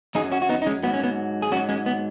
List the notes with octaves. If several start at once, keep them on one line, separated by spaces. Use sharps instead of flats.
F#2 F#3 D#4 G#4
C#4 F#4
F#4
B3 D#4
D#4
G#3 C#4
G#2 F#3 B3
C#4
B3
G#4
G#2 F#3 C#4 F#4
G#3 C#4
B3